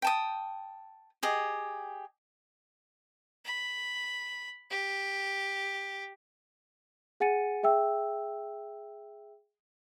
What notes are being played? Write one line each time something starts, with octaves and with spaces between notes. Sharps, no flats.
G5 A5 D#6
G4 G#4 D#5
B5
G4
G#4 F#5 G#5 A6 C#7 D#7
G#4 E5 G5 E6